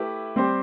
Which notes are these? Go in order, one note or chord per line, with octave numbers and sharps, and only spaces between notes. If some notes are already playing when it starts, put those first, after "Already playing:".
Already playing: A3 E4 G4 B4
G3 C4 G4 C5